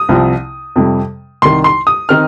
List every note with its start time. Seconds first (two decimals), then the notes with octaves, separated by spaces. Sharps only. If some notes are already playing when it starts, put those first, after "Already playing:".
Already playing: D#6
0.09 C2 C3 F3 C4
0.76 F2 C3 G3
1.42 C2 C3 D#3 C6
1.64 C6
1.87 D#6
2.09 D#3 C4 D#4 F6